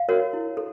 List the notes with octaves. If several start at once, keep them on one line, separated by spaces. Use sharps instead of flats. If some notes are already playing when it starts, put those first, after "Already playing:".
Already playing: F5
F#4 A#4 C#5
E4
A4